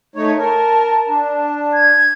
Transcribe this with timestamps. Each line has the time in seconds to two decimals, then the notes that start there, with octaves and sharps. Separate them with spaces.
0.16 A3 D#4 C#5
0.38 A#4 A5
1.08 D4
1.74 G#6